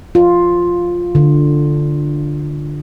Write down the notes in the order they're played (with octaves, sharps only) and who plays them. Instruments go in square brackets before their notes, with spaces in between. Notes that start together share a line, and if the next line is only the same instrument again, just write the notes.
[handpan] F4
D3